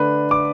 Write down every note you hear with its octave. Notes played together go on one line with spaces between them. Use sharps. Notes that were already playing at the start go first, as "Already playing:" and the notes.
Already playing: D3 A3 D4 B4
D6